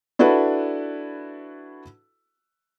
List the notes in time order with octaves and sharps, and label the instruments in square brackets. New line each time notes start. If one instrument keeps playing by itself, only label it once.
[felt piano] D4 E4 F#4 A4 B4